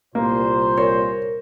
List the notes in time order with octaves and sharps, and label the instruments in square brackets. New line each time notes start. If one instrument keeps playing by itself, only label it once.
[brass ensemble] C2 A#2 C5 [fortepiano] A#3
[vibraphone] A#4 [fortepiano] C#5